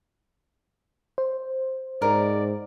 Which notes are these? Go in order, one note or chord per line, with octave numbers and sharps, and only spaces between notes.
C5
G#2 A#4 D5